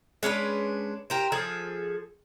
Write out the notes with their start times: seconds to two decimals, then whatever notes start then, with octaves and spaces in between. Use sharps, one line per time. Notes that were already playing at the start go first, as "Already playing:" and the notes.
0.23 G#3 C#4 D4 B4
1.10 G4 A#4 C5
1.32 F3 G#4 A4